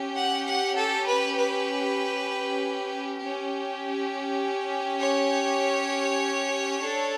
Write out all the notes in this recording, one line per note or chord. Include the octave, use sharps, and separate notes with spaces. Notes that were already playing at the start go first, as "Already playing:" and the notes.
Already playing: C#4 G4
F#5
F#5
A4
B4
B4
G4
C#4
C#5
D4 A4